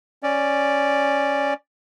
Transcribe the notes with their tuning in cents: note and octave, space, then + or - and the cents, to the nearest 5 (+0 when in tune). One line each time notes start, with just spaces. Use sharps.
C#4 +0 D5 +0